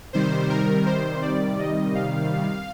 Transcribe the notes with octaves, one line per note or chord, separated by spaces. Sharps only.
C3 D#3 G3 C5
A#4
C5
D5
D#5
F5